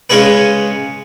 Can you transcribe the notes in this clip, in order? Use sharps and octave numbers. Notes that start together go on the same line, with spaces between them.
C#3 G#3 C#4 G#4 B4